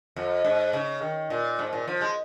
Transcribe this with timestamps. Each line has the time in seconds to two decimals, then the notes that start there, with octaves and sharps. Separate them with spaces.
0.16 F2
0.45 G#2
0.73 C#3
1.02 D#3
1.30 A#2
1.59 G#2
1.73 A#2
1.88 F3
2.01 G#3